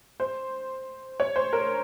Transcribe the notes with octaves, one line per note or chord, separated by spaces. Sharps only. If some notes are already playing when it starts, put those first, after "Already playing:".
C5
C#5
C5
A#4